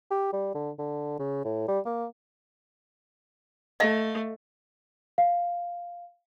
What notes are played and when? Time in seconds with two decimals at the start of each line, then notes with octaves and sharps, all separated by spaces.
0.11 G4
0.33 G3
0.54 D3
0.79 D3
1.19 C#3
1.44 A2
1.68 G3
1.85 A#3
3.80 A3 D#5 F5
5.18 F5